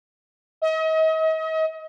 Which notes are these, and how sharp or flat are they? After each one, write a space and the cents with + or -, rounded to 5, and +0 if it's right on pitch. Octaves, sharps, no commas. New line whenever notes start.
D#5 +40